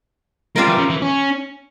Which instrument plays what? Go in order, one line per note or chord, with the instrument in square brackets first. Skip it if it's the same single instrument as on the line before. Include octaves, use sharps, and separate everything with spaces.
[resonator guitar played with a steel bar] G3 C4 F4 A#4 [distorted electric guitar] G#3
[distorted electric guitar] E3
C#3
E3
C#4